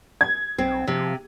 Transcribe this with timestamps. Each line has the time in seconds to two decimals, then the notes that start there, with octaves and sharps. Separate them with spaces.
0.21 G#6
0.58 B1 C4
0.88 C3 F3